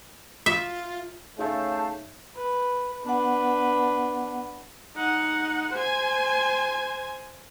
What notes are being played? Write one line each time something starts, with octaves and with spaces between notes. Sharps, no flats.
F4 E5
C#3 A3 D#4 C#5 E5 F5 A5 G6
B4
B3 D4 B4 F#5
D#4 F#5
C5 G#5